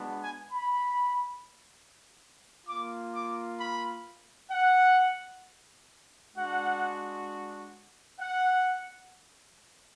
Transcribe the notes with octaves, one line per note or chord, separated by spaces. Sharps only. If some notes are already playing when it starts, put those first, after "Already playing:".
Already playing: G#3 B3 D4 F#4
G#5
B5
A#3 F4 D6
D6
B5
F#5
G#3 D4 F#4 F#5
F#5